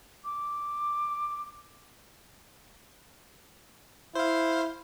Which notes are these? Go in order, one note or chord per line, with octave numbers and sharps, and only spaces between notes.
D6
E4 C5 F5